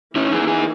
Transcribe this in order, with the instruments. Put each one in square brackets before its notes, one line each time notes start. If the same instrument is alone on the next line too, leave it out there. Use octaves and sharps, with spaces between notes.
[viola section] E3 A#3 D#4 [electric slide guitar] C#4 E4
[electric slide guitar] E4 G#4
E4 G#4